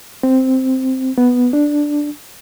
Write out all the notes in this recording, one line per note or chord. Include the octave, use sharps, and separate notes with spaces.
C4
B3
D4